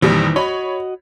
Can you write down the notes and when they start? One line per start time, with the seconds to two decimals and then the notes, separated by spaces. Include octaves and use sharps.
0.02 A#1 F2 D#3 E3 G3
0.36 F#4 C#5 D#5 B5